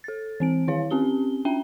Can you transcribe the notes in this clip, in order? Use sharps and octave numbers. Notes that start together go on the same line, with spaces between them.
A4 A6
E3 C4 D7
D#3 E4 C#5 F5
C4 C#4 G4 G7
C#4 D4 E5 G5 G7